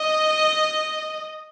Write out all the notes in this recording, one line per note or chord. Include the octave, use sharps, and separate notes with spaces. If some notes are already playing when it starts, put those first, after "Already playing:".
Already playing: D#5